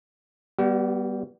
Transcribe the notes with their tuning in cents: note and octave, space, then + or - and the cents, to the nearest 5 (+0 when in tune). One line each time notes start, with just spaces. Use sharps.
G3 +0 B3 -15 F#4 +40